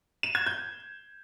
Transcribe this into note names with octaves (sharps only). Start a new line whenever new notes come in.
E7
G#6
G6